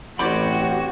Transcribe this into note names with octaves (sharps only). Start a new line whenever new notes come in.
A1 C4 F#4 G4 C#5 D5 G5 B5